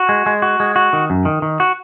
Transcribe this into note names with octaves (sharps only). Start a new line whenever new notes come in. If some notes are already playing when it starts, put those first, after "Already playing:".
Already playing: F#4
G#3
G#3
F#4
G#3
F#4
D#3
F#2
D#3
D#3
F#4